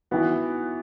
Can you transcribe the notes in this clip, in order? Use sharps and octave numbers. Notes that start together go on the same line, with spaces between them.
E3 B3 F#4